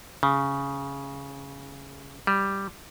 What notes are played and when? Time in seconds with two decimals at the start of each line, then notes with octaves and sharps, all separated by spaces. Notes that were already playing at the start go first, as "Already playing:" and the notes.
0.23 C#3
2.27 G3